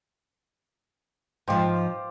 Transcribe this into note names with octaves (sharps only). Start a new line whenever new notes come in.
G#2 F3 F4 G4 C5